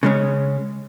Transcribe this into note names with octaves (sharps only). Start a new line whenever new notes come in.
C#3 G#3 C#4